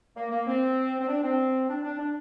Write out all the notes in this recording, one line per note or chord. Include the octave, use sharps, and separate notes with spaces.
A#3
A#3
C4
C4
D4
C4
D4
D4
D4